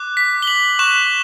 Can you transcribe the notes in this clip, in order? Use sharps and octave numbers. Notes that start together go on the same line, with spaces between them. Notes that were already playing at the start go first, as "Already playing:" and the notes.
Already playing: D6 F#6
B6
G7
F#7
C#6 F#6 E7